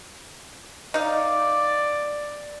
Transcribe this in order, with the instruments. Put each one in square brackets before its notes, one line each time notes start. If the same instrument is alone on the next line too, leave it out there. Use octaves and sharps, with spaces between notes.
[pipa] D#4 F5 [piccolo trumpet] D5